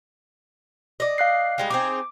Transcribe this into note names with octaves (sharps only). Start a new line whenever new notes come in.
D5 D#5
F5 F#6 C7
G3 G#3 D#4
C4 D#4 G#4 D6